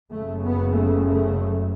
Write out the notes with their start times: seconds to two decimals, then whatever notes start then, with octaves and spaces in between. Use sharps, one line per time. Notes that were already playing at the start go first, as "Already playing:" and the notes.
0.11 F#1 F#2 C#3 A3
0.43 B3
0.74 A3
1.06 A3